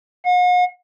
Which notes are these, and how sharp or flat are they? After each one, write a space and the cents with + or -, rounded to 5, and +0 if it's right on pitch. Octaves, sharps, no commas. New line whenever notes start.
F#5 -45